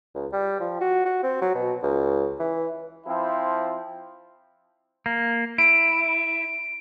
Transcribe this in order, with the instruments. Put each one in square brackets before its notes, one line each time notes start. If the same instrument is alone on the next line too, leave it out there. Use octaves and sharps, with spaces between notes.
[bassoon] C#2
G3
F3
F#4
F#4
C4
F#3
B2
C#2
E3
[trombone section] F3 C4 E4
[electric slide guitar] A#3
[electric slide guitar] E4 [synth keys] D7